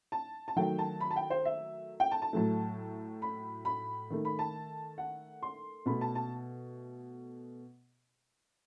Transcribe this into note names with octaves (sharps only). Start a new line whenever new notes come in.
A5
A5
D#3 F#3 A3 G5
A5
B5
A5
G5
C5
E5
G5
A5
A5
A2 F#3 A3
B5
B5
D#3 A3
B5
A5
F#5
C6
B2 A3 B5
A5
A5